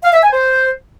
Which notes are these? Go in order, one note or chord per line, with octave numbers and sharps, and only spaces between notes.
F5
E5
G#5
C5